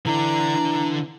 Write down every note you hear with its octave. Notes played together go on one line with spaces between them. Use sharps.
D3 E3 D4 A#5